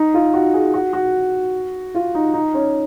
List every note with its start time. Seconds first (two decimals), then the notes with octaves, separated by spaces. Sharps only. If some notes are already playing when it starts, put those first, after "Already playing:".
Already playing: D#4
0.14 F4
0.34 F#4
0.54 G#4
0.74 F#4
0.93 F#4
1.95 F4
2.15 D#4
2.33 D#4
2.54 C#4